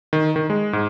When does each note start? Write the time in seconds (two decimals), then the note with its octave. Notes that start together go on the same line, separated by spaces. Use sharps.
0.13 D#3
0.36 D#3
0.50 G#3
0.73 G#2